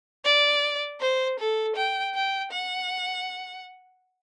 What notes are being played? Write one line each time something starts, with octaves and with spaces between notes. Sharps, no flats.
D5
C5
A4
G5
G5
F#5